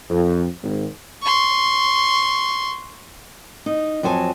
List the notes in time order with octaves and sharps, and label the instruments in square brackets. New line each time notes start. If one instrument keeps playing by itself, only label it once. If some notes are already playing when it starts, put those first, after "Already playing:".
[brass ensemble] F2
G#1
[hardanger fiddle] C6 C#6
[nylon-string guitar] D#4
F2 F#3 C5 G#5 A5